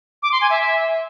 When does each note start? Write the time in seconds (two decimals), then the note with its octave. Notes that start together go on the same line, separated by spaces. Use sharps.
0.23 D6
0.32 C6
0.41 G#5
0.50 E5